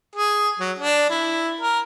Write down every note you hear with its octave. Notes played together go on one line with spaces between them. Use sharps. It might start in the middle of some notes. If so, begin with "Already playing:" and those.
G#4
F#3
D4
E4
A#4